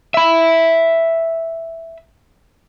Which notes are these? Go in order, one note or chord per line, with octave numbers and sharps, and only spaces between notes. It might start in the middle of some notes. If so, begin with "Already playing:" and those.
E5 B5